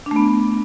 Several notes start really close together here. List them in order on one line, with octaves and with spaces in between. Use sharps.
D4 A3 B3